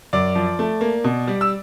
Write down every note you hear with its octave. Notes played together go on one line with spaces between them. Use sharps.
F#2 D5 D6
F3
A3
A#3
B2
G3
E6